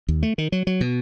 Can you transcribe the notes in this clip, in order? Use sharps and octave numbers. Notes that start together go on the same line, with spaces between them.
D#2
A3
D#3
F#3
F#3
B2